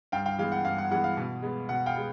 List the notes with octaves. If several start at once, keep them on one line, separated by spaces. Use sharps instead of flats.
G2 F5 G5
F5 G5
E3 G#3 B3 F5
F#5
G2 F5
F#5
E3 G#3 B3 F#5
F5
B2
G#3 B3
B2 F#5
F5 G5
G#3 B3